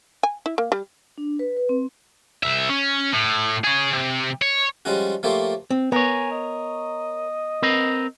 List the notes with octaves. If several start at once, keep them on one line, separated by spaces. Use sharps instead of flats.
G#5
E4
A#3
G3
D4
B4
B4
C4
C2 E5
C#4
A2
C#4 G#4
C3
C#5
F3 G3 G#3 C#4 F#4
F3 A3 A#3 G4 C5 C#5
C4
B3 A#4 C#5 G#5
D#5
C4 A#4 B4